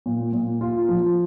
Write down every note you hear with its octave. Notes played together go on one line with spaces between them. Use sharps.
A#2
A#2
F4
F3